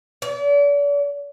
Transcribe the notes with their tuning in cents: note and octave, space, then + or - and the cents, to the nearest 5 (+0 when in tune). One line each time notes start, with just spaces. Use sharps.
D5 -40